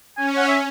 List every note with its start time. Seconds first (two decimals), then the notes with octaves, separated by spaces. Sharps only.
0.17 C#4 G#5
0.37 F#5
0.48 E5